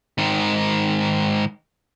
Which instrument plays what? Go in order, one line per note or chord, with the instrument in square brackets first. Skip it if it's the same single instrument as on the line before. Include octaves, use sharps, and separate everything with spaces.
[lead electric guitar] G#2 D#3